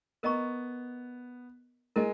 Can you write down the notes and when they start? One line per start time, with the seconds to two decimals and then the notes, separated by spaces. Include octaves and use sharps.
0.23 B3 A#4 D#5 A#5 C#6
1.96 G#3 E4 A#4 D#5 G#5